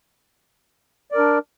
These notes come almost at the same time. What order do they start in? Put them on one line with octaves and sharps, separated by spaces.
D5 A#4 D4